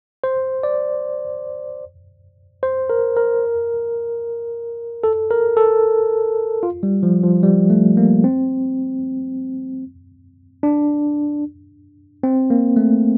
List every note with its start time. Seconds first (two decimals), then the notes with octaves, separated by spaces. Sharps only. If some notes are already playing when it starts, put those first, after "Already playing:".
0.24 C5
0.63 D5
2.63 C5
2.90 A#4
3.16 A#4
5.04 A4
5.30 A#4
5.57 A4
6.63 F4
6.83 G3
7.03 F3
7.24 F3
7.43 G3
7.70 A3
7.97 A#3
8.24 C4
10.63 D4
12.23 C4
12.50 A#3
12.76 A3